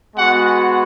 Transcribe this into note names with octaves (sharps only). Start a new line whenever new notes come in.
G#3 B3 F#4 F#5